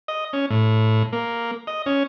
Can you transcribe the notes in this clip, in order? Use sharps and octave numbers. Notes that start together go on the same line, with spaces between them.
D#5
C#4
A2
A#3
D#5
C#4